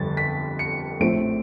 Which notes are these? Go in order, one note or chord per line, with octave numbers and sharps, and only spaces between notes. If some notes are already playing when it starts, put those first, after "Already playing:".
Already playing: G1 F2 D3 G3 A6
B6
C#7
A#1 A2 F3 A3 C4 D7